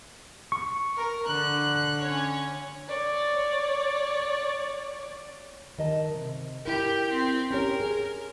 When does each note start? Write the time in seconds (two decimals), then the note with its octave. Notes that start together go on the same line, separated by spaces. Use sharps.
0.52 C#6
0.99 A#4
1.28 D3 F#6
2.02 C#4 C#5
2.89 C#5 D5
5.78 D#3 D#5 A5
6.14 C3
6.65 E4 G4 A#4
7.12 C4
7.51 C#4 G4 A#4 C#5
7.80 G#4